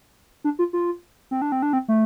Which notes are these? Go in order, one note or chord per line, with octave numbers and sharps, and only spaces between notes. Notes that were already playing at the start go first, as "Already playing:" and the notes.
D4
F4
F4
C4
D4
C4
D4
C4
A3